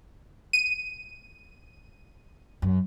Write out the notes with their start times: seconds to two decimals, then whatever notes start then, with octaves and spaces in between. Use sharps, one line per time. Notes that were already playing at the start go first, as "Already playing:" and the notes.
0.53 D#7
2.62 F#2